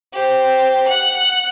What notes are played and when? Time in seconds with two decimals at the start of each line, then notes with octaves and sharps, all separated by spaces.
0.13 G4 C5
0.87 F#5 F#6